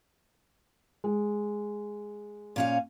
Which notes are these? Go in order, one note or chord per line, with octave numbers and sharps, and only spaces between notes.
G#3
A#2 C#4 F5